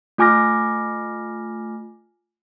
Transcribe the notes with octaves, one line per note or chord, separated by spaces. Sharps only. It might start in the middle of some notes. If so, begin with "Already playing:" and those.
A3 F4 G#5 D6 F6 A#6